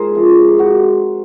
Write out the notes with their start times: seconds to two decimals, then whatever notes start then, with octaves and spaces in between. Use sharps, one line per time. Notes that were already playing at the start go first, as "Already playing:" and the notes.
Already playing: G#2 G#4 A#4 C5
0.15 C3 F3
0.59 F#4